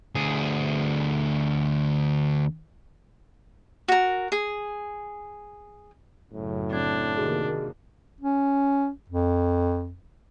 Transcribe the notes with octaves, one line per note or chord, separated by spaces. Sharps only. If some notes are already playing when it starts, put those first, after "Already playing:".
D2 G#4
F#4 A#4
G#4
F#1 A2 C#3 F#3
C4 D4 G#6
C3 D#3 A#3 F#4 G#4
C#4
F2